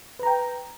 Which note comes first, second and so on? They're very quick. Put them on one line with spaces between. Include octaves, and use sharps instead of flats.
B4 A#5 G5